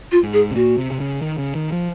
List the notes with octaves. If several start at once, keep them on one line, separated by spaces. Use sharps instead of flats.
F4
G#2
G#4
C3
A#2 F#4
C3
C3
C#3
D#3
C#3
D#3
F3